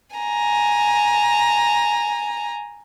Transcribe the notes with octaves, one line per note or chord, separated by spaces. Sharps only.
G#5 A#5